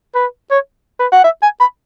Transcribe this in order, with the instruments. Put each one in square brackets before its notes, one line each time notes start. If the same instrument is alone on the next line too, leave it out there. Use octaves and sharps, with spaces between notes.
[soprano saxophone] B4
C#5
B4
F#5
E5
G#5
B5